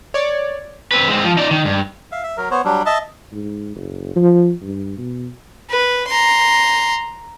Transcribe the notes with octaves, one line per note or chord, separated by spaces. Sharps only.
C#5 D5
C4 B4
G#3 C4
F3
D#4 D5
D#3
G2
E5 F5
E5
F#3 A#4
B3 C5 C#5
F#3 G3 D4
D#5 E5 A5
G#2
F#1
F3
G2
B2
B4
A#5 C6